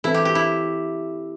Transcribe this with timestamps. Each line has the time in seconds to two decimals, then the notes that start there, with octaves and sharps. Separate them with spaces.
0.04 E3 C4 E4 A4
0.14 G4
0.25 G4
0.35 E4